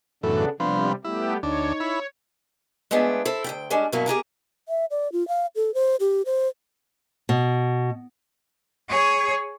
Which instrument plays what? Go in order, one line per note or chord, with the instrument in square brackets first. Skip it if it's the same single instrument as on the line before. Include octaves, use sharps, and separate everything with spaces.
[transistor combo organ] F#2 A2 E3 [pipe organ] C#3 B3 D4 [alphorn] A4
[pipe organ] C3 G3 [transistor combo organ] F3 B3 C4 [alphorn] D4
[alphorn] G3 [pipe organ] A3 B3 G4 [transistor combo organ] E4
[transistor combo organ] D2 D4 [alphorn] D#4 [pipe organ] C#5
[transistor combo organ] E4 B5
[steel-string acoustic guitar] G#3 A3 B3 D4 F4 G#4
E4 A4 C5
D2 B2 G5
G3 G#3 C#4 D4
G2 B2 F#3 A#3 E4
G4 G#4 A#4 A#5
[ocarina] E5
D5
F4
F5
A4
C5
G4
C5
[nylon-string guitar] B2
[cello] G#4 C#5